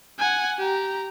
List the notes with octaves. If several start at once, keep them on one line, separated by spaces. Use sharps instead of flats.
F#5 G#5
G4 A#5